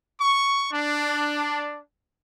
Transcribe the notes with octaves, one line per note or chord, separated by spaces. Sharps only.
C#6
D4